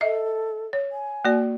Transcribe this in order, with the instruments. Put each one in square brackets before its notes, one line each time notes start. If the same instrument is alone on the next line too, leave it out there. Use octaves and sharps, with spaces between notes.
[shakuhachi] A4 [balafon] D#5 E5
[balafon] C#5
[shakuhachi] G#5
[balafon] A#3 F#4 D5